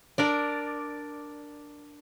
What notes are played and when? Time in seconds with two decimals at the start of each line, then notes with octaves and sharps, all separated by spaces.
0.18 D4 A#4 D5